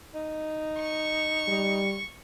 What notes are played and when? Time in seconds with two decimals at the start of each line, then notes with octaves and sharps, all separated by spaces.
0.14 D#4
0.79 C#6
1.48 G3